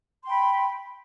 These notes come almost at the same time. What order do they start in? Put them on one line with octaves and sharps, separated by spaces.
C6 G5 B5